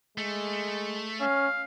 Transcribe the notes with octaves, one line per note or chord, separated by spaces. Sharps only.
G#3 A3
C#4 F5